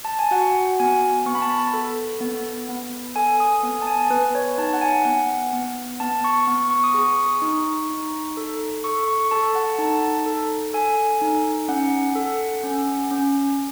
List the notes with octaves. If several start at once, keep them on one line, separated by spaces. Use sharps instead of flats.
A5
G#5
F#4 F#5
B3 G#5
B3 C#6
B5
A5
B5
A4
B3
B3
A4 G#5
D#6
B3
A5
G#5
B3 B4
C#5
D#4 A5
F#5
G#5
B3 F#5
B3
B3 A5
C#6
B3 C#6
C#6
D#6
G#4 C#6
D#4
D#4
A4
A4 C#6
C#6
A4 A5
F#5
D#4 A5
A4
A4 G#5
D#4
C#4 F#5
A4
C#4
C#4